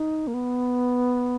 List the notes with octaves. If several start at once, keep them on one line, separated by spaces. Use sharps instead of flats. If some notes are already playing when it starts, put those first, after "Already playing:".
Already playing: D#4
A#3
B3